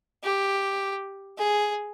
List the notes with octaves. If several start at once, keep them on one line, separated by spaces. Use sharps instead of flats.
G4
G#4